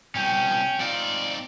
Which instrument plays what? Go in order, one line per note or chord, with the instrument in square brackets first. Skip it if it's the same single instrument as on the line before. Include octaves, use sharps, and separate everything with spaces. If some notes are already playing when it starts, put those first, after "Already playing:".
[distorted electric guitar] C2 B2 [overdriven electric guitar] C#4 [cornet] G5
[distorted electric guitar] C4 D#4 [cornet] F4 [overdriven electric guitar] D5